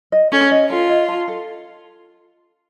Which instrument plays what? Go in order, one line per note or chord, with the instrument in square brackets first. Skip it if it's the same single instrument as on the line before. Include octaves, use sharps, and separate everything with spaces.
[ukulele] D#5
[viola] C#4 [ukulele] A4
[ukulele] D#5
[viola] F4 [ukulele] A4
[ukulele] D#5
A5
A4